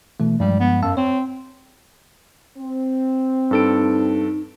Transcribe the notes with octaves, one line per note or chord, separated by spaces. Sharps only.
B2 E3 A3
G2 F3 G3 G#3
B3
F#2 F5 A5 E6
C4 C#5
C4
G2 D#4 A4 D7